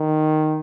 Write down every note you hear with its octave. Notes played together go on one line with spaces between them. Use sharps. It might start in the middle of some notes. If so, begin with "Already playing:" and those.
Already playing: D#3